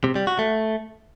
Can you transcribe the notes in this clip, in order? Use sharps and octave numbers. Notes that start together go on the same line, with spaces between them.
C3
G3
F#4
A3